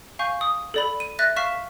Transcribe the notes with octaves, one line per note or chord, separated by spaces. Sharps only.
F5 G#5 C#6 G6
D#6
A4 D5 B5
D#7
E5 F#6 A6 A#6
F5 C#6 F6 B6 E7